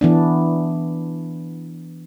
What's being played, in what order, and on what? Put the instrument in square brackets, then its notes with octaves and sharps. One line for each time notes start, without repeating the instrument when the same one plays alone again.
[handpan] E3 B3 D4